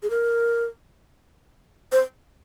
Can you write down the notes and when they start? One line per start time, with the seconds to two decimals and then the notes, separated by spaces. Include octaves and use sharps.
0.03 G#4
0.10 A#4
1.92 C5